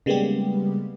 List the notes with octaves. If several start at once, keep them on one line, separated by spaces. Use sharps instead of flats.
C#3 G3 G#3 A#3 B3 G4